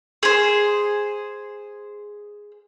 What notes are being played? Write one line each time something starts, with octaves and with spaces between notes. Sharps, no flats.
G#4 C5